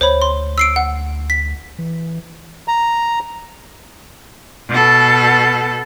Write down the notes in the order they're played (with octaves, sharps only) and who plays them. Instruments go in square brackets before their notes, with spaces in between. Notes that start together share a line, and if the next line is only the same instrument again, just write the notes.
[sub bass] D2 [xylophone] C5 C#5 B5
[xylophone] C6
E6 C7 D7
F#5
B6
[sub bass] E3
[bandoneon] A#5
[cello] B2 A4